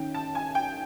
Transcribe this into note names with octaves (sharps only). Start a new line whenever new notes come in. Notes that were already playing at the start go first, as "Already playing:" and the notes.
Already playing: D#3 C#4 G5
A5
G#5
G5